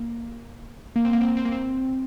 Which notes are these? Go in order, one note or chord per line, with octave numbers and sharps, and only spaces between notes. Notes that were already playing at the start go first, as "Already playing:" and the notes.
Already playing: A#3
A#3
C4
A#3
C4
A#3
C4
A#3
C4